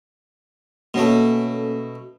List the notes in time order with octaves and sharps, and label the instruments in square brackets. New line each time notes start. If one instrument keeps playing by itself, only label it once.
[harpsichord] B2 A3 [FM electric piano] A#3 C#4 A4